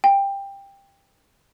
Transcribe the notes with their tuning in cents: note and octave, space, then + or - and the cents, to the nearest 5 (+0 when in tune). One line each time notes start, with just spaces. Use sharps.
G5 +15